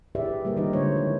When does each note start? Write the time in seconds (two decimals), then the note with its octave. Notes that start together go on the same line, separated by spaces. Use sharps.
0.15 E4 G4 G#4 B4 D5 E5
0.45 G3 A#3 G4 A#4 C5
0.57 D#3 D4 D#4 F4 B4 D#5
0.73 D3 G#3 A3 C5 C#5
0.96 F3 G#3 E4